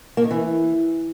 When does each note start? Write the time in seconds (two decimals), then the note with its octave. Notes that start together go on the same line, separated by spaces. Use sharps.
0.17 A#3
0.24 D#3
0.31 E3